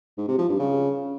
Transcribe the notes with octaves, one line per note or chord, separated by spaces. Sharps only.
G#2
C3
F3
G2
C#3